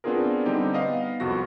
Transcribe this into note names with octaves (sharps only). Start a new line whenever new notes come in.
B3 C4 D4 F4 G#4 A#4
D3 G3 C4 D#4 G4
B3 D#5 F5
C2 F2 F#4 A#6